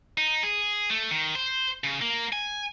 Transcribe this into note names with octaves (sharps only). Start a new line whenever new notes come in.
D#4
G#4
A3
D#3
C5
C#3
A#3
G#5